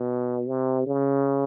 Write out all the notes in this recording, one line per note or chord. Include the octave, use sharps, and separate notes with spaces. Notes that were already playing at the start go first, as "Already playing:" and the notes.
Already playing: B2
C3
C#3